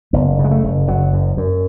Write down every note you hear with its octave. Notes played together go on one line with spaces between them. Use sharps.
F#1 B3
C#3
G#3
A3
F#1
F#1 F#3
F#2
F#2